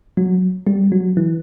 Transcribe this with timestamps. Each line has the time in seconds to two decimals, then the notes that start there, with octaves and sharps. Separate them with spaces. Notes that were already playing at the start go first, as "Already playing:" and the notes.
0.17 F#3
0.67 G3
0.92 F#3
1.17 E3